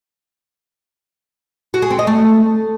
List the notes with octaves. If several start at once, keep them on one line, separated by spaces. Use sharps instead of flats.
F#4
G#4
C4
D#5
A3